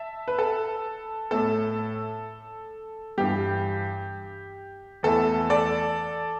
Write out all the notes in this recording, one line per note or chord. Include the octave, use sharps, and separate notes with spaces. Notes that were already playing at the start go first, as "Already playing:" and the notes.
Already playing: E5 A5
B4
A4
A2 A3 A4
G2 E3 G3 G4
E2 E3 A3 A4
A4 D5